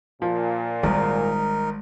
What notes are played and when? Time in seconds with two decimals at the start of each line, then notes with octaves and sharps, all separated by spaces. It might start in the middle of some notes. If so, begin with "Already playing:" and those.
0.22 A#2 F3
0.83 G#1 G3 G#3 D#4 A#4